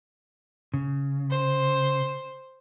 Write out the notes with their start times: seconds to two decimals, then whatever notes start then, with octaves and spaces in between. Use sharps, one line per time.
0.74 C#3
1.30 C5